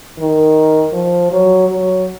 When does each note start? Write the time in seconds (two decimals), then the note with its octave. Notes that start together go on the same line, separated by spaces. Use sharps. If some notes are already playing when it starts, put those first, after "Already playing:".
0.18 D#3
0.93 F3
1.31 F#3
1.69 F#3